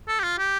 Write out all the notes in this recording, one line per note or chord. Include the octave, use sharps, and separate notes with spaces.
A4
G4
F4
G4